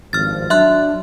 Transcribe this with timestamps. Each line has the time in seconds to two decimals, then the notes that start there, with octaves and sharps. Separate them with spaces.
0.13 G#1 G2 F3 F6 A6
0.50 F#3 D4 E5 C6 F#6